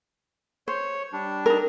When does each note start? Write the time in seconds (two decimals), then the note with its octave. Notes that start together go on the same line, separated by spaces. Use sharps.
0.68 C5 C#5
1.13 G3 D4
1.46 D#4 A#4